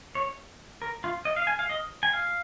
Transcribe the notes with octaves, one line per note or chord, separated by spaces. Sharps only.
C#5
A#4
F4
D#5
F5
G#5
F5
D#5
G#5
F5